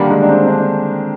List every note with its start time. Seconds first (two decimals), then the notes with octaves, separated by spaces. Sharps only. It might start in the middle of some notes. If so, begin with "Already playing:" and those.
Already playing: D3 D#3 G3 A#3
0.11 G#3
0.22 D4
0.29 C4
0.48 D4